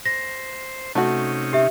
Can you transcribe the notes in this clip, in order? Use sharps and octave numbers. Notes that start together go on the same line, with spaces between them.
C5 A#6
C3 A3 C#4 D#4 F#4
G4 E5